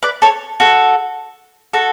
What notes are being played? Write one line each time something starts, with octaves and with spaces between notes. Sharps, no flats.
B4 D5
A4 C#5
F#4 A4
F#4 A4